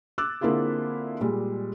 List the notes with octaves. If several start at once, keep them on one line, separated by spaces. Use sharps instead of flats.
D6 E6 F#6 A6
D3 A#3 C4 E4 F4 G#4
A#2 G3 G#3